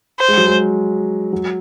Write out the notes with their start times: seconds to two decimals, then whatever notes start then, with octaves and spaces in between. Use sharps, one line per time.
0.20 C5
0.28 G#3
0.37 F#3
0.47 G#3
1.33 F#3